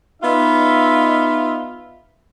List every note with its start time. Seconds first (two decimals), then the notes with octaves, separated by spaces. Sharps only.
0.22 B3 D#4 F4 E5